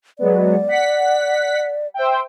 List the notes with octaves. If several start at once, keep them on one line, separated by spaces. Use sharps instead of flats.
F#3 G#3 B3 D5
F#5 B6
C5 E5 G5